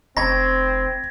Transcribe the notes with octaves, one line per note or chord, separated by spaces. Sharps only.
F1 C4 D#5 B5 C#6 G#6 A#6